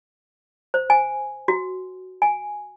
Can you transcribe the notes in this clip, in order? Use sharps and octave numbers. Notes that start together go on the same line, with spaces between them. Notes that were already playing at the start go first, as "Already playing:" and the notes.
C5
G#5
F#4
G#5